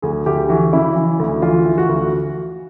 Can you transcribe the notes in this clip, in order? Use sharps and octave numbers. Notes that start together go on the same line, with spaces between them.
D2 G#4
D2 G4
E3 F#4
C#3 E4
E3
D2
E3 F4
E3
F#4
D2